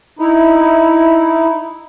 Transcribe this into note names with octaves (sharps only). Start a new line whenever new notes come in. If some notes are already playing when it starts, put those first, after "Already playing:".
D#4 E4